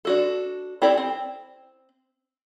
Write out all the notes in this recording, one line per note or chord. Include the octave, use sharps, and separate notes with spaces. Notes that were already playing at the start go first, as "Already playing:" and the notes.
D4 F#4 A4
C4 E4 G4 A4 D5
C4